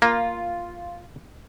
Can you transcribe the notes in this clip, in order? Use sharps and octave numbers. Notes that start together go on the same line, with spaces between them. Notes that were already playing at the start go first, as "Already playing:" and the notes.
A#3 F4